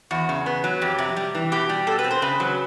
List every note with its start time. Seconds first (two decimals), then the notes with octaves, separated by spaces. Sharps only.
0.11 E2 F#4
0.29 C#3
0.46 B3
0.64 F#3
0.81 F2 G4
0.98 C3
1.16 G3
1.35 E3
1.52 B2 G4
1.69 G3
1.87 B2 A4
1.99 B4
2.04 C4
2.11 C5
2.22 C#3 B4
2.40 F#3